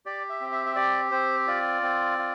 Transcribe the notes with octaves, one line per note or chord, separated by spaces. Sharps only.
G4 D5
E5
C4
E5
E5
G4 D5
C4 C5
F4 D5
C4
F4